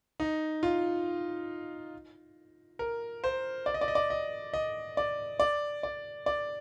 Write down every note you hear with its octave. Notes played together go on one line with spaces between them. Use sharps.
D#4
F4
A#4
C5
D5
D#5
D5
D#5
D5
D#5
D#5
D5
D5
D5
D5